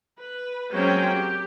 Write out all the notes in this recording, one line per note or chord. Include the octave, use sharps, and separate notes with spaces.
B4
F#3 G#3 A#3 C4 C#4 G5
G4